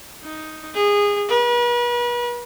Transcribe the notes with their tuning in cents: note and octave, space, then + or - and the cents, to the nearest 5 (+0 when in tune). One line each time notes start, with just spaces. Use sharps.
D#4 +5
G#4 -20
B4 -40